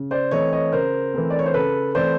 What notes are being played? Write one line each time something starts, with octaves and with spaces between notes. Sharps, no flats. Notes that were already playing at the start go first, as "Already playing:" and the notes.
Already playing: C#3
C5 D5
E3 A3 C4 C#5 D#5
C#5 D#5
C#3 A#4 C5
E3 A3 C4
D5
C#5
C5
C#3 A4 B4
E3 A3 C4 C5 D5